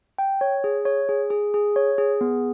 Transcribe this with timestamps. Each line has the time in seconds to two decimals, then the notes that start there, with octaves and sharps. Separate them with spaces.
0.18 G5
0.41 C#5
0.64 G#4
0.85 C#5
1.09 G#4
1.30 G#4
1.54 G#4
1.76 C#5
1.98 G#4
2.21 B3